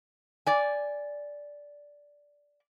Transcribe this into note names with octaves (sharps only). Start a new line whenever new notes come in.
D5 G#5